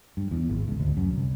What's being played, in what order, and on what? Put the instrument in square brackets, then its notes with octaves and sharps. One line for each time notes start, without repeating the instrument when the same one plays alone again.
[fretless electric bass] G2
E2
G#1
C#2
D2
F#2
C2